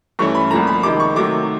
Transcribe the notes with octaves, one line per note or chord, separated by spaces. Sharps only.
G2 E3 A3 C#4 C#6
B5
C2 A#2 F3 A3 A#5
B5
C3 D#3 G#3 D6
C#6
C3 D#3 F#3 A3 D6